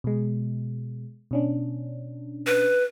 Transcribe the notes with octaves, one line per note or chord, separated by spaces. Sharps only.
B2 G#3
B2 C#4 D4
B4